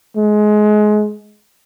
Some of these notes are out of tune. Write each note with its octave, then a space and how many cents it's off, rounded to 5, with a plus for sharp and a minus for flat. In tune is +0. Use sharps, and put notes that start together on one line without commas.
G#3 +25